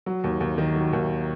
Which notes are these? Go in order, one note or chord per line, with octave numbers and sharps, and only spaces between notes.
F#3
D#2
D#2
D#3
F#3
D#2